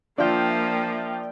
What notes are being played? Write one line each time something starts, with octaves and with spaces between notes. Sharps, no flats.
F3 A#3 D4 F4 D5 E5 G5